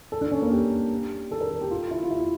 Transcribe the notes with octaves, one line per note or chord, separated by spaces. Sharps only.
A4
D4
C#4
A#3
G4
A4
A#4
A4
G4
F4
E4
F4
E4